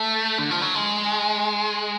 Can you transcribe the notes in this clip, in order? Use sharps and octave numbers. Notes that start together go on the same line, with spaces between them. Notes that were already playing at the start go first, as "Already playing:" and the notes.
Already playing: A3
D3
F3
F#3
G#3